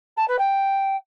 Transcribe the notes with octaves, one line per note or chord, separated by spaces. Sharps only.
A5
B4
G5